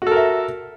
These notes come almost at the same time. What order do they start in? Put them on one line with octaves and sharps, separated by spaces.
F#4 A4 A#4 E5